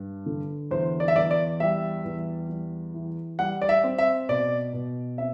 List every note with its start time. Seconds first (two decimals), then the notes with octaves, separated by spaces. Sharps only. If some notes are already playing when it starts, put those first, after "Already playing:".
Already playing: G2
0.26 D3
0.71 E2 C5
1.00 D5
1.08 E5
1.15 E2 D5
1.31 D5
1.60 G3 E5
2.04 E2
2.49 G3
2.94 E3
3.39 G3 F#5
3.62 D5
3.69 E5
3.84 C4
3.98 E5
4.29 B2 D5
4.73 B2
5.18 C4 E5